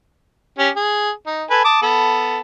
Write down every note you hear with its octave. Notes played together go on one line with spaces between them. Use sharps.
C#4 G4
G#4
D#4
A4 B4 G#5
A5 D6 D#6
B3 A4